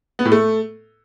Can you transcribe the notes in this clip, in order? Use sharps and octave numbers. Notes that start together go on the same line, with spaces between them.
B3
A2
A3